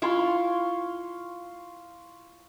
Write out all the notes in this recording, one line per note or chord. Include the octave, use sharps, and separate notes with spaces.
E4 F4 F5 C6 C#6